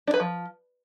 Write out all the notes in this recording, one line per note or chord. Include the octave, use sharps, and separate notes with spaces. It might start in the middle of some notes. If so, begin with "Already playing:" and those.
D4
B4
F3